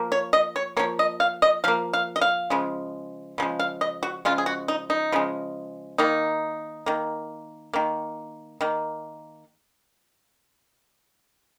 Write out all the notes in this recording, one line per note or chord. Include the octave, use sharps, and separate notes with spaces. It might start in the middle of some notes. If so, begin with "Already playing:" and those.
Already playing: F3 A#3
C#5
D#5
C#5
F3 A#3 C#5
D#5
F5
D#5
F3 A#3 F5
F5
D#5
F5
C#3 F3 G#3
C#3 F3 G#3
F5
D#5
F#4
C#3 F3 G#3 F4
G#4
F#4
D#4
D#4
C#3 F3 G#3
D#3 A#3 D#4
D#3 A#3
D#3 A#3
D#3 A#3